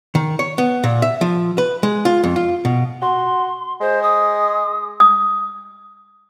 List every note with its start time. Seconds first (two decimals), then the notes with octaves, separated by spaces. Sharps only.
0.15 D#3
0.39 C#5
0.58 B3
0.84 A#2
1.02 E5
1.21 F3
1.58 B4
1.83 G#3
2.05 F4
2.24 F2
2.36 F4
2.65 B2
3.02 F#4 C6
3.81 G#3 C5
4.03 D#6
5.00 D#6